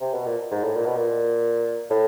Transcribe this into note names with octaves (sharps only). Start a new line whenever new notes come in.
C3
B2
A#2
G#2
A2
A#2
B2
A#2
A2